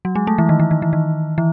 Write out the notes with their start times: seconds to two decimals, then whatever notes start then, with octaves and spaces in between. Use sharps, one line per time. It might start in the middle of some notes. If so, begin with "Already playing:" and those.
0.05 F#3
0.15 G#3
0.27 A3
0.38 E3
0.49 D#3
0.60 E3
0.71 D#3
0.82 E3
0.93 D#3
1.38 E3